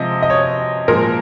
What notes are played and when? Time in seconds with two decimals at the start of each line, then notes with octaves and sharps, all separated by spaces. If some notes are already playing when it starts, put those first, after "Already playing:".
Already playing: C3 F3 G#3 D#5
0.23 D#5
0.30 C#5
0.88 A#2 F3 G#3 A#4